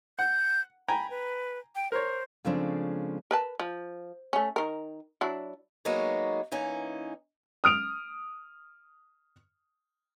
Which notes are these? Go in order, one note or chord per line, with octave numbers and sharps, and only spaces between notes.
F#5 G6
G5 G#5 A#5 B5
B4
G5
A#4 C5 C#5
C#3 F3 G#3 A3 C4 D4
A#4 B4 A5
F3
A3 C#4
D#3 A#4
F#3 D4 E4
F#3 G#3 A#3 B3 D#4 C#5
E3 A#3 C#4 D#4
D#6 F6 D7 F7